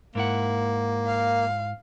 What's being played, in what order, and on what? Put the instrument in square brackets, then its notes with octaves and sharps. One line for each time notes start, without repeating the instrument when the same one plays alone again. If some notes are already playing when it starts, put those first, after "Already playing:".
[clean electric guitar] G#2 E4 F#5 [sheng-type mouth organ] A#3
[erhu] F5